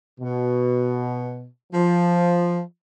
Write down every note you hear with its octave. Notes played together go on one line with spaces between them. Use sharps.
B2
F3